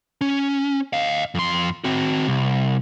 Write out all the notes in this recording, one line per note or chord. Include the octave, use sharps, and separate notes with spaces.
C#4
D#5 F5
F2 C6
C4 F#4
C2